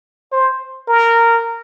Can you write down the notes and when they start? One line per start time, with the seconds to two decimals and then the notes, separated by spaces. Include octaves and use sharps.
0.32 C5
0.88 A#4